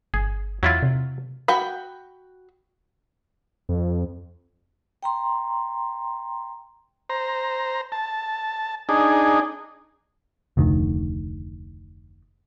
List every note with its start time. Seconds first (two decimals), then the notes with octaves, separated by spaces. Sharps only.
0.14 G1 G#4
0.63 E2 F#3 E4 F4
0.82 C3
1.48 F#4 G5 B5
3.69 F2
5.03 G5 A#5 C6
7.10 C5 A#5
7.92 A5
8.89 D4 D#4 G#4
10.57 F1 D2 D#3